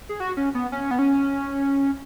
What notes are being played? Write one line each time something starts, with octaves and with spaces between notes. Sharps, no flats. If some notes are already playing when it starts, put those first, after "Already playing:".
G#4
F#4
C#4
B3
C#4
B3
C#4